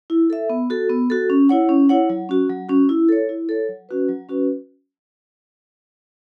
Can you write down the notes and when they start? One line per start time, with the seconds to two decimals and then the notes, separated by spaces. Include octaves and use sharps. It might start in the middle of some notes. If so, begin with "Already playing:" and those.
0.10 E4
0.30 A4 E5
0.50 B3
0.70 F#4 A4
0.90 B3
1.10 F#4 A4
1.30 C#4
1.49 E4 C#5 F#5
1.69 C#4
1.89 E4 C#5 F#5
2.10 F#3
2.29 C#4 F#4
2.50 F#3
2.69 C#4 F#4
2.89 E4
3.08 A4 C#5
3.29 E4
3.49 A4 C#5
3.69 F#3
3.89 C#4 F#4 B4
4.08 F#3
4.29 C#4 F#4 B4